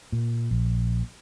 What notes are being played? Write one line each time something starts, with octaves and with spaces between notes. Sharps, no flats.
A#2
A#1